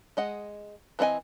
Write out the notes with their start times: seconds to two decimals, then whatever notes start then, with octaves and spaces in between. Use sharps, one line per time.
0.17 G#3 D#5 F#5
0.99 E3 C4 F#4 D#5 G#5